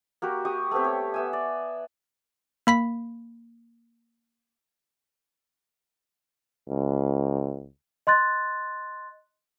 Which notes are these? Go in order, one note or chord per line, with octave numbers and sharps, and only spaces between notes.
A#3 F#4 G4 A#4
G4 C#6 D#6
A3 B3 C4 G4
C#5
B3 E5 G#5
D5
A#3 B5 B6
C#2
D#5 C6 F#6 A6